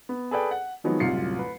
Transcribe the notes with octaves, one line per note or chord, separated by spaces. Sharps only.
B3
G#4 A4 B4 D5 G5
F#5
D#3 F3 F#3 G#3 B3 D#4
D1 C2 F#2 F4 C7 C#7
B4